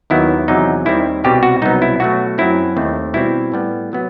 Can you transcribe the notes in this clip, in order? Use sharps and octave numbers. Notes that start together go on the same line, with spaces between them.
D#2 D#3 F#3 B3 E4
E2 C3 F#3 D#4
D#2 D#3 G3 C4 E4
C2 B2 G3 C4 G4
F#4
C2 B2 F#3 B3 D#4
E4
B2 F#3 A3 F#4
F#2 F#3 C4 E4
D#2 D#3 A3 C4
B2 G3 C4 E4
A2 G3 B3
C3 F#3 B3